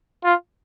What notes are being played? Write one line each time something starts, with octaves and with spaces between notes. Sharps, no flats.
F4